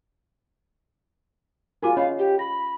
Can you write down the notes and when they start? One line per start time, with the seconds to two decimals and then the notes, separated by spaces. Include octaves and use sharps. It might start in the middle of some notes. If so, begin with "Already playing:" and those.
1.83 D#4 F4 F#4 G#4 A#4 G#5 D6
1.97 C#4 C#5 D#5 F5 B5
2.18 G4
2.39 B5 A#6